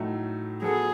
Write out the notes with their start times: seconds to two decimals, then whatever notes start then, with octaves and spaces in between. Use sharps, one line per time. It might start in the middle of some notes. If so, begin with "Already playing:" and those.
Already playing: A2 F#3 A3 D#4
0.62 F#3 B3 F#4 G#4 A4